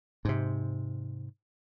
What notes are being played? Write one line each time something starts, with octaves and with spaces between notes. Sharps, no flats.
G#2 C3